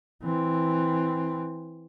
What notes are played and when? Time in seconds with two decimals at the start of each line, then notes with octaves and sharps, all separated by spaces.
0.23 E3 C4